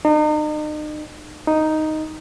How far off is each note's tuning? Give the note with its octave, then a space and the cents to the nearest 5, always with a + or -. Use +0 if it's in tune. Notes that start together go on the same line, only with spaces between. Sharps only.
D#4 -40
D#4 +0